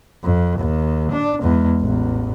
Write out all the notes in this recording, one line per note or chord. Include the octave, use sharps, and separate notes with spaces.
F2
D#2
D4
E2 G#3
A1 E2